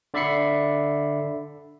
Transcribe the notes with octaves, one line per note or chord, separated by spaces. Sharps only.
D3 D5 E5 B5 C7 C#7